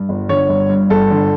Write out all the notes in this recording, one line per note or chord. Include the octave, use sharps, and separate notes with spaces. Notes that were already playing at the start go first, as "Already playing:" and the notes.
Already playing: G2
G1
D3 C#5
G1
G2
G1 A4
D3